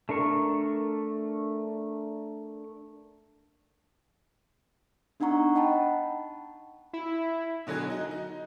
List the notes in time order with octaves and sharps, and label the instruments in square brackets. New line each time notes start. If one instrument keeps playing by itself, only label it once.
[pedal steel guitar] A3 D4 A#4 C#6
[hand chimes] B3 D4 D#4 F#5 A#5 C#6
D#5 F#5 G5 A5 B5
[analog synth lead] E4
[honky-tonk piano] B2 D3 F#3 F#4 G#4
D#4 F#4
D#4